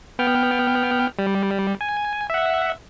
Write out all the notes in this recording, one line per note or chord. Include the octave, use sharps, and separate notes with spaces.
B3 G5 F6
G3
G#5
E5 F#5